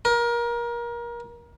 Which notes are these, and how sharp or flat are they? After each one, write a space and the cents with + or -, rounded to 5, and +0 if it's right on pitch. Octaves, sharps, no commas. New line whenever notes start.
A#4 +25